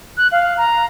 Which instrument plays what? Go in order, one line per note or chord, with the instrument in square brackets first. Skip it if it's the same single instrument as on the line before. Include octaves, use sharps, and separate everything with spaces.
[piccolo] F#6
F5
A#5